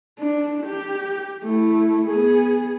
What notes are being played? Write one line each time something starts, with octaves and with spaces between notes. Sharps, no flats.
D4
G4
A3 E4
B3 G#4